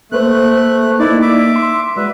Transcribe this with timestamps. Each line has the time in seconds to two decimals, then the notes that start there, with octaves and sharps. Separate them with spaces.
0.12 A3 A#3 B4 C5 F#6
0.99 A#3 D#4 E4 D5
1.22 E5 D6
1.56 C6
1.96 G#3 F#4 B4 D5 E5